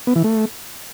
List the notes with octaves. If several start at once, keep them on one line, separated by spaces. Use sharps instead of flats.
B3
E3
A3